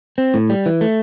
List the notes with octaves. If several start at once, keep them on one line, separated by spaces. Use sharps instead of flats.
C4
A2
G3
E3
A3